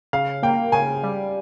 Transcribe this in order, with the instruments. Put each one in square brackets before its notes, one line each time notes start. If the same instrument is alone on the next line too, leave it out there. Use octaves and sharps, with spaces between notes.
[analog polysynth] C#3 [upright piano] F5
[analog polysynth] A#3 [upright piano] G5
[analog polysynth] C#3 [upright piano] G#5
[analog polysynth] G3